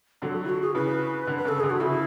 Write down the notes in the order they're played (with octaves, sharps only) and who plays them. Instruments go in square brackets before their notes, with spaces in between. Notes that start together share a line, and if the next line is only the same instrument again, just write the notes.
[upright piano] D3 F#3 [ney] A4
[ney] F#4
E4
F#4
G#4
[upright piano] C#3 E3 [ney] B4
[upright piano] D3
[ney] B4
[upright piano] C#3 [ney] A4
[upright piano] D3 [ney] G#4
[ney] F#4
[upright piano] C#3 E3 [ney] E4